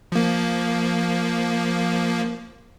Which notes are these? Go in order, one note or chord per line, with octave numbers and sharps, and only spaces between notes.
F3 A#3